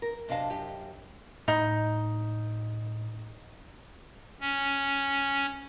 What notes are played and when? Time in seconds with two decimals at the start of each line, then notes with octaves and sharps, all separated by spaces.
0.02 A#4
0.28 F#2 C3 D4 D#5 F5 A5
0.50 F#2 G4
1.48 A2 D#4
4.41 C#4